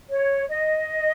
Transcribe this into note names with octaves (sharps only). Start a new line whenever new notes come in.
C#5
D#5